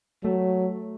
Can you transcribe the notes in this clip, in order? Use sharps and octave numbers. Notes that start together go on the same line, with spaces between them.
F#3 A3